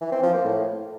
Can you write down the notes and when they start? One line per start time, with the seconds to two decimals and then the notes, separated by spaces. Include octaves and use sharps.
0.01 E3
0.12 C4
0.23 F3
0.34 A#3
0.45 A2